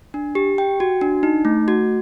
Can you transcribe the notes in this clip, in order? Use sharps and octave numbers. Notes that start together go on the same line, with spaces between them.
D4
G4
G5
F#4
D4
D#4
A3
F#4